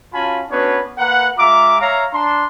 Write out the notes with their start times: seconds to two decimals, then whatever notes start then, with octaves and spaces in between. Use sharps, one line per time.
0.14 C#4 F4 F#4 G#5 A5 B5
0.51 B3 C#4 D4 F#4 B4 C#5
0.98 A#3 A#4 B4 F#5
1.38 G#3 F4 E5 A#5 D6
1.80 C#5 E5 F5 A#5
2.13 D4 A#5 C6